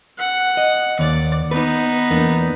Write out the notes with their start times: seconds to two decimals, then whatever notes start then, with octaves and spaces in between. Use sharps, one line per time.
0.18 F#5
0.57 D#5
0.99 D#2 D5
1.51 B3 D#4 B4
2.10 E2 A#3 D4